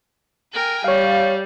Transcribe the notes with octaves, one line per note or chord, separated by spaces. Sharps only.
A#4 G5 G#5
G3 C#5 F5